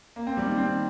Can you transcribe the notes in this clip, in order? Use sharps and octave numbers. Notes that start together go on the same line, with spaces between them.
A#3
C4
G3
D#3
C4